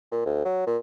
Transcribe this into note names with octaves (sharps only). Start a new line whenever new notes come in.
A#2
D2
F#3
A#2